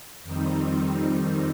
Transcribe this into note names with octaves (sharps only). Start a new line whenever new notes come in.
F2 D#3 G3 C4 D#4